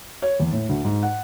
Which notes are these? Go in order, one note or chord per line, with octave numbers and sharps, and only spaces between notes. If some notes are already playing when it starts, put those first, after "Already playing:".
C#5
E2
A2
D2
G#2
F#5